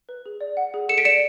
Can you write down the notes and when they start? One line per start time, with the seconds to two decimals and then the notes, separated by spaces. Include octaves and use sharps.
0.09 B4
0.26 G#4
0.41 D5
0.57 F#5
0.74 G#4
0.89 A4 C#7 E7
0.98 B6 D7
1.05 D5 C#7 E7